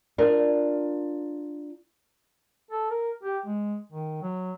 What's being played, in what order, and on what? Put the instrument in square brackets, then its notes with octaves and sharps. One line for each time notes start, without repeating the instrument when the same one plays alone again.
[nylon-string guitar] D4 F4 A#4
[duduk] A4
A#4
G4
G#3
D#3
F#3